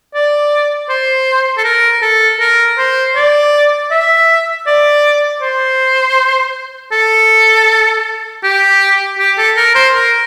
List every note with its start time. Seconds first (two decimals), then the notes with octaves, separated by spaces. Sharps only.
0.14 D5
0.89 C5
1.57 A4
1.64 A#4
2.02 A4
2.40 A#4
2.78 C5
3.15 D5
3.91 E5
4.66 D5
5.41 C5
6.92 A4
8.43 G4
9.18 G4
9.38 A4
9.57 A#4
9.75 C5
9.94 A#4